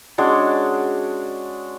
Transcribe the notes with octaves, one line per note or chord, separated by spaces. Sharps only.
G#3 C#4 D4 F#4